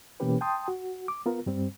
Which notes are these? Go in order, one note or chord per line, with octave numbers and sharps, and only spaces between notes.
B2 E3 A#3 C#4 G4 B4
G5 A5 C6 D#6
F#4
D6
B3 F4 A#4
G2 G3 C4